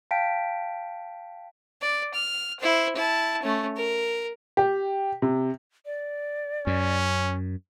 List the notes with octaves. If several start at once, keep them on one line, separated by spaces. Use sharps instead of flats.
F5 G5 A5 B6 D7
D5
F6
E4 C5
E4 A5
A3 C#4
A#4
G4
C3
D5
F#2 C#4